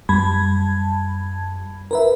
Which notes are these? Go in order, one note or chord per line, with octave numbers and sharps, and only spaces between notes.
F#2 G3 A5 B5 G#6
A#4 B4 E5